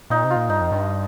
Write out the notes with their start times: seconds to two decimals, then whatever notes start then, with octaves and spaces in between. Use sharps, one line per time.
0.10 A#2 D#4
0.24 C3
0.30 F4
0.36 A#2
0.49 G2 D#4
0.61 F2
0.72 G2